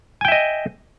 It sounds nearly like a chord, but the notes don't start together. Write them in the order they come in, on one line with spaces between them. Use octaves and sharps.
G#5 G5 E5 D#5